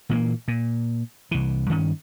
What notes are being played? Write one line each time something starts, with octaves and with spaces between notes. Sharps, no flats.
A#2 E3 F#3 A#3
A#2
C2 E3
G2 D#3 C#4